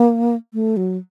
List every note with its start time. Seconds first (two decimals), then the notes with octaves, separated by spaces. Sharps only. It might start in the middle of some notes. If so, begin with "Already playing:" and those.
Already playing: A#3
0.54 A3
0.77 F#3